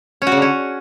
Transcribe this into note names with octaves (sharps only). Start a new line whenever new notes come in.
C#4
F#4
C#3
D3
C#4